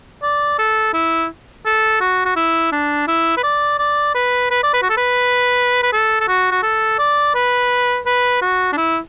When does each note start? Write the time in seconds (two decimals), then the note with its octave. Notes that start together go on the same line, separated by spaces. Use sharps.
0.23 D5
0.59 A4
0.94 E4
1.66 A4
2.00 F#4
2.25 F#4
2.36 E4
2.72 D4
3.08 E4
3.37 B4
3.43 D5
3.79 D5
4.15 B4
4.51 B4
4.63 D5
4.74 B4
4.83 F#4
4.90 A4
4.97 B4
5.83 B4
5.93 A4
6.21 A4
6.28 F#4
6.51 F#4
6.63 A4
6.99 D5
7.35 B4
8.06 B4
8.42 F#4
8.73 D4
8.77 E4